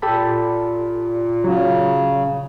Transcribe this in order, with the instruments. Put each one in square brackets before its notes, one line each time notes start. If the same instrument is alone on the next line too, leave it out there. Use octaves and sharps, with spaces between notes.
[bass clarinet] A#2 [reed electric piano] G4 A4 B5
[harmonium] C#3 [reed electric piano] F#3